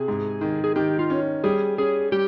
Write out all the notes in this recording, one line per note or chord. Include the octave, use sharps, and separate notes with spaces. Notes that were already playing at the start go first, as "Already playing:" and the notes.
Already playing: C3 G#4
G#2
D#3
G#4
D#3 G4
F4
C#4
G3 G#4
C#4 G#4
G3 G4